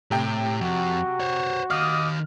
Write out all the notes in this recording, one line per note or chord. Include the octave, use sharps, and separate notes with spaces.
A2 C3 G5
F2 F#4
C5 C#5
D#3 D#5 F5 D6 D#6 F6